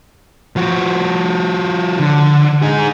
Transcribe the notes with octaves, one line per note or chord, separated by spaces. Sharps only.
F3 F#4
D3
D#4 G#4